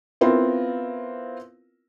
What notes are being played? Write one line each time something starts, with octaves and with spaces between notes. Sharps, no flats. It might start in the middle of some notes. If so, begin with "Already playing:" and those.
B3 C4 E4 F4 A#4